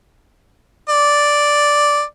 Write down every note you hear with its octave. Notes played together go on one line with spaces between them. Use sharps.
D5